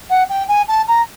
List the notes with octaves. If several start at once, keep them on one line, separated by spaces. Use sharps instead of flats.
F#5
G5
G#5
A5
A#5